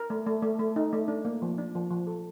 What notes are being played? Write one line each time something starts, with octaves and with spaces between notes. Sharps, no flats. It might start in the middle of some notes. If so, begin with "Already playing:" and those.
Already playing: A#4
A3
A3
A3
A3
D#4
A3
D4
A#3
F3
D4
F3
F3
A4